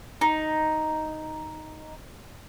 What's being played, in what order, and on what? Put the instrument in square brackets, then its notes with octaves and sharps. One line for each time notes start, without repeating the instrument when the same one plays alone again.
[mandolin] D#4